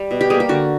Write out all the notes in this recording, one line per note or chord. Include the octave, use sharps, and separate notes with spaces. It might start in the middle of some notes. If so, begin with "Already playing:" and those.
Already playing: G3
B2
G4
G3 A#3 G#4
G4
D3 F#4